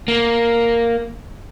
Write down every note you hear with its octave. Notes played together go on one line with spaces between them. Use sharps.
A#3